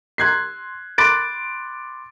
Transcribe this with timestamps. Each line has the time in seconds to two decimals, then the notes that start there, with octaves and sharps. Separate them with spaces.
0.18 C6 F#6 G#6 C7
0.98 B5 C6 D6 F#6 A6 D7